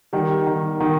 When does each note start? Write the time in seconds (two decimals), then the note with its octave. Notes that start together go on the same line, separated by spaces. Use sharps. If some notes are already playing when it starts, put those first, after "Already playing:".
0.13 D#3 G3
0.47 D#3
0.80 D#3